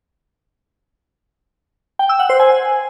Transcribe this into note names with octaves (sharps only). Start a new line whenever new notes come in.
G5
E6
F#5
C5
G#5